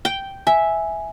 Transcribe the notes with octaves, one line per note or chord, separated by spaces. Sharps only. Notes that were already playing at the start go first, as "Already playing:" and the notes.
G5
E5 G#5